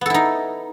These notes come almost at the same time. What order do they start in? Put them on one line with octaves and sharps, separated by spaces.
B3 A4 E4 D#4